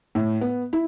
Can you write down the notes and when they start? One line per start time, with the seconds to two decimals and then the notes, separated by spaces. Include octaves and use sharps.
0.15 A2
0.41 B3
0.73 E4